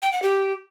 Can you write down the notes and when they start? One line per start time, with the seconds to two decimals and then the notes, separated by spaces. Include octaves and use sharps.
0.02 G5
0.12 F#5
0.22 G4